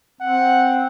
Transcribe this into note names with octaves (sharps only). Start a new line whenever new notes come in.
C4 F#5